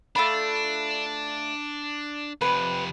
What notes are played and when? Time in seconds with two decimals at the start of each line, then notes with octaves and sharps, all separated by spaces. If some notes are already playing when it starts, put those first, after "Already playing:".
0.16 A3 D4 F4 B5
2.41 F2 C3 B4